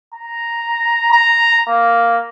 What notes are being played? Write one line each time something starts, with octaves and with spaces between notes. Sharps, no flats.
A#5
A#5
A#3